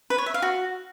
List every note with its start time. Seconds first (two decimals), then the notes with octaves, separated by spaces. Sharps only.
0.10 B4
0.18 C#5
0.26 E5
0.34 F5
0.42 F#4